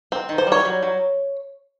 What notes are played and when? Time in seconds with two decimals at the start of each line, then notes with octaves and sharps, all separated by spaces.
0.12 C4
0.29 D#3
0.38 C5
0.47 G3 C#5
0.65 F#3
0.83 F#3